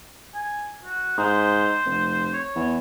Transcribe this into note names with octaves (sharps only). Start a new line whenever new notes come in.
G#5
F#4
G#2 C5
F1
C#5
E2